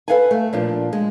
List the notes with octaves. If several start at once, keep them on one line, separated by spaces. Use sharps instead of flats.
A4 B4 D5 F5 F#5 G#5
A3
A#2 F3 D4
G#3